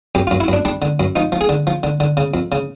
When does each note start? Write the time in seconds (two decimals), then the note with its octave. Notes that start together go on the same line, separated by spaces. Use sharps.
0.15 F#2 G4
0.27 F#2 F4
0.40 E4
0.48 F#2 D4
0.65 G3 D4
0.82 D3
1.00 F#2
1.16 F3 D#4
1.32 F3
1.41 G#4
1.49 D3
1.67 F3
1.83 D3
2.00 D3
2.17 C#3
2.34 F2
2.52 C#3